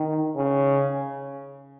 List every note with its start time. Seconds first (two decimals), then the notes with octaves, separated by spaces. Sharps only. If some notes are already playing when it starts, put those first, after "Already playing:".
Already playing: D#3
0.36 C#3